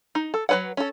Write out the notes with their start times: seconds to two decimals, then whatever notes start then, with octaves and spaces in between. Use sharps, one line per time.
0.15 D#4
0.34 A4
0.49 F#3 E4 B4 C#5 F#5
0.77 C#4 A4